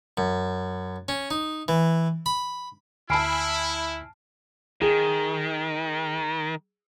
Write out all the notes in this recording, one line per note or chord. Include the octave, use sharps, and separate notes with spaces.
F#2
C#4
D#4
E3
B5
D2 E4 G#5 A5 B5 F6 C7 D7
D#3 G#4